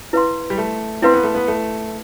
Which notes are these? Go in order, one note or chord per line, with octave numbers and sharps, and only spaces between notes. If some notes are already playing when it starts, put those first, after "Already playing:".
E4 B4 F5 C6
G3
A3
C4 E4 B4 F5 C6
B3
A3
B3
A3